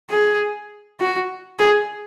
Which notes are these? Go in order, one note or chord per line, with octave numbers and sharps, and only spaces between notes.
G#4
F#4
G#4